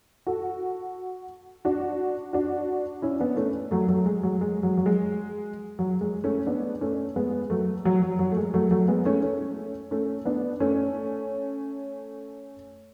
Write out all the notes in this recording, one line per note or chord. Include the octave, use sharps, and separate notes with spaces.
F#4 A4
D4 F#4
D4 F#4
C#4 E4
B3 D4
A3 C#4
F#3 A3
F#3 A3
G#3
F#3
G#3
F#3
F#3
G#3
F#3
G#3
A3 C#4
B3 D4
A3 C#4
G#3 B3
F#3 A3
F#3
F#3
F#3
A3
G#3
F#3 A3
F#3 A3
G#3 B3
A3 C#4
A3 C#4
A3 C#4
B3 D4
A3 C#4